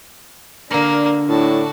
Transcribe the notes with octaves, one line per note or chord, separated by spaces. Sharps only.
D3 A#3 D4 A#4
A2 D4 F#4 A5